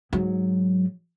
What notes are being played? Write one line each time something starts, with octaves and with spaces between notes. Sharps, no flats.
G#2 F#3